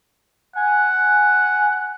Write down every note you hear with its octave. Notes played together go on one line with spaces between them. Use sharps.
F#5 G#5